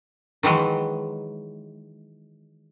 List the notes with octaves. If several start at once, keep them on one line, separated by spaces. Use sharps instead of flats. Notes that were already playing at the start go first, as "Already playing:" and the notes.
D#3 E3 F#3 G#3